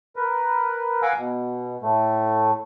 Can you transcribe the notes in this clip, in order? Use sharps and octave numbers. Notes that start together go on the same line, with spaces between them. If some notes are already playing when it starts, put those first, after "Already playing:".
A#4 B4
F5 F#5 G#5 A#5 D6 E6
B2
A2 A3